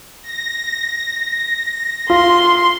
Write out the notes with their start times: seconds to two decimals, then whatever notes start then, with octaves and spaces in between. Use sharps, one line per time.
0.22 A#6
2.10 F4 C6